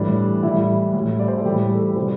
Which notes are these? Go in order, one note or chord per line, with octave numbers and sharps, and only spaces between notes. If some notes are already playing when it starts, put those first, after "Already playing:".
Already playing: A2 E3 G3 D4
A2 E3 G3 E4
A2 G3
D5
C5
A4
A2 E3 G3 G4
A4
C3 G3 C5